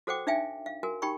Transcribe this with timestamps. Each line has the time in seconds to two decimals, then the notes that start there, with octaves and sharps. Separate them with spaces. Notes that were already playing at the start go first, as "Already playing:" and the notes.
0.07 F#4 A4 C5 F#5 G5 D6
0.27 D4 D#4 E5 F5 G5 G#5
0.66 F5
0.83 F#4 A#4 G#5
1.02 D#4 G4 G5 B5 C#6